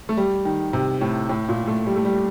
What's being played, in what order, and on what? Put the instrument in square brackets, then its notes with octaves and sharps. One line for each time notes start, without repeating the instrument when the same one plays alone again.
[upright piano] A3
G3
D#3
C3
A2
A2
A#2
A3
G3
A3
G3